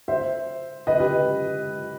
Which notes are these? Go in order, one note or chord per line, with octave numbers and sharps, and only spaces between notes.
C5 E5
B4 D#5
G4 B4